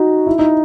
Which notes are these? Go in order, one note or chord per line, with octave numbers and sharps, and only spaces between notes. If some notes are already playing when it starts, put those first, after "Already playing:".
Already playing: D#4 F#4
E4
D#4